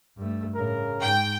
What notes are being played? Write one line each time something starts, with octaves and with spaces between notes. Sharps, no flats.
G2 A3
A2 C#3 A#4
G#2 G5